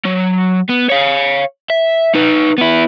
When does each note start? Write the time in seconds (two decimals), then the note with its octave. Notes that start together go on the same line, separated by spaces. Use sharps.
0.05 F#3
0.69 B3
0.90 C#5 F5
1.70 E5
2.15 D#4 B4
2.58 B3 E4